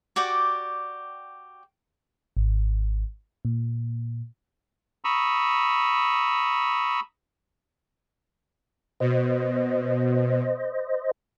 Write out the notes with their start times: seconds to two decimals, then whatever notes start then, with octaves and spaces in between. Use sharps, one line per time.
0.16 F#4 G4 D5 G5
2.37 G#1
3.45 A#2
5.04 A#5 B5 C#6 D#6 E6
9.00 B2 C5 D#5